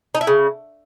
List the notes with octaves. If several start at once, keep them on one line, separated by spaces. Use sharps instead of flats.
D#4
E4
C#3